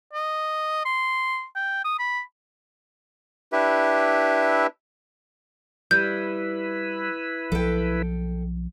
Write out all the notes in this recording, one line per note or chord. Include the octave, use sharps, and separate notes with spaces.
D#5
C6
G5
D#6
B5
D4 E4 G4 B4 E5
G3 E4 B4 G6
B1 F3 A4 G5